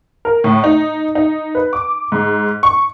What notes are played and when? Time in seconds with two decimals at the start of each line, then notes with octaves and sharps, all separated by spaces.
0.25 A#4
0.44 A2
0.64 D#4
1.15 D#4
1.55 B4
1.73 D6
2.12 G#2
2.63 C#6